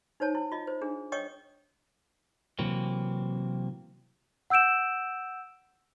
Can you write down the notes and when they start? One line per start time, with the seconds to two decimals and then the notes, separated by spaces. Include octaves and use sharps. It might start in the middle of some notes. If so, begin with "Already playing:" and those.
0.20 D#4 C5 C#5 A5
0.35 E4
0.52 F4 D#5
0.67 C5
0.81 D4 G#4
1.12 C#5 D#5 G5 C#6 D#6
2.59 C3 E3 F#3 A#3 C4
4.50 F#5 E6 G6 D7 E7